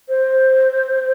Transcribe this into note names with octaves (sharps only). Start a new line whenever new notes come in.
C5